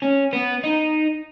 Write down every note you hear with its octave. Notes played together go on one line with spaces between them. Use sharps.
C#4
B3
D#4